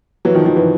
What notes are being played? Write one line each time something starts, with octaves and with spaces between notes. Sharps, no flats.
E3 F#3
D#3 F3
D#3 F3
E3 F#3